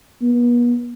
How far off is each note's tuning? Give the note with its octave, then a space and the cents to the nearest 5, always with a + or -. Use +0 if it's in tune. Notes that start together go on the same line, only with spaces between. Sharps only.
B3 -40